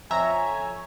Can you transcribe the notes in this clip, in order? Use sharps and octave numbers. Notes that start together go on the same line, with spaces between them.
F2 C#5 E5 G#5 A#5